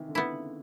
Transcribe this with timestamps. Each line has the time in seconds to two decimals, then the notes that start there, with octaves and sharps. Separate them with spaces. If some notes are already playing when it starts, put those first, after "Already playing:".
Already playing: C3 D#3 E3
0.08 D3
0.15 C#3 B3 E4